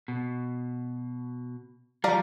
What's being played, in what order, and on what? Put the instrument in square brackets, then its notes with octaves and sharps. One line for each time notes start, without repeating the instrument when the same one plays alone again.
[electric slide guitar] B2
[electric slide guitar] F3 G3 [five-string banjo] D5 F5 A#5